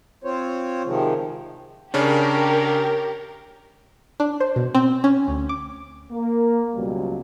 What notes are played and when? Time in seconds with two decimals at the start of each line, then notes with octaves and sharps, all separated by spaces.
0.24 C4 F4 C5 C#5
0.84 C3 D#3 F3 G#3
1.94 C#3 C#4 D4 G4 A#4
4.20 D4
4.40 C5
4.56 B2
4.75 C4
5.04 C#4
5.28 D2
5.49 D6
6.11 A#3
6.75 C#2 B2 F#3 G3